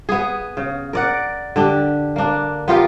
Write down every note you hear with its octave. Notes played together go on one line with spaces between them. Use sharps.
B3 G#4
C#3
A#4 D5 F#5
D3 D4 G4
A#3 D4
B3 F4 G4 A#4